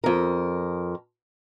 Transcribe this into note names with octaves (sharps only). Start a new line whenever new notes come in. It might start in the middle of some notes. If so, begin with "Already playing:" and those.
F2 A#4